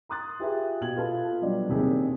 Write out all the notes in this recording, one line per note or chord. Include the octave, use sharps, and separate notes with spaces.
A#5 C6 D#6 F#6 A6
F4 G4 G#4 B4 E5
B2 F4 G4 G#6 F#7
F4 A4 B4 A5
F#3 G3 B3 D4
D#2 C3 G#4